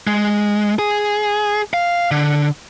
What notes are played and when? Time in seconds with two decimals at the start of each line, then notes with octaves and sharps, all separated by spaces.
0.07 G#3
0.79 G#4
1.74 F5
2.11 D3